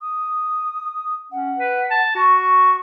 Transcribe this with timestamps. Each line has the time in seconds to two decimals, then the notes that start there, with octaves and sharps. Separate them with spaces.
0.01 D#6
1.32 C#4 F#5
1.57 B4
1.90 A5
2.15 F#4 C#6